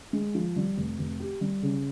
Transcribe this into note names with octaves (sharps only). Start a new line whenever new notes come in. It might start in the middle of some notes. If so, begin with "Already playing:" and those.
G#3
F3
G3
F1
F1
G4
G3
C#3